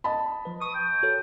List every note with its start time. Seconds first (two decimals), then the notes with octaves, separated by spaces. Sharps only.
0.04 D#5 A5 B5
0.45 F3 B4
0.62 C#6 D#6
0.74 G5
1.03 F#4 A4 C#5